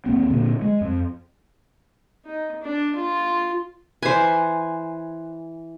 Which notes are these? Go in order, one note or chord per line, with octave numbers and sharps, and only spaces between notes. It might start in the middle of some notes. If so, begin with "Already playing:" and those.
D#2 A#3 C4
A#2 D3 A#3 D4
G#3
F2
D#4
D4
F4
E3 B4 C5 G#5